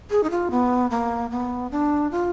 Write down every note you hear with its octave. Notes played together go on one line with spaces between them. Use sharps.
G#4
D#4
F4
B3
A#3
B3
D4
F4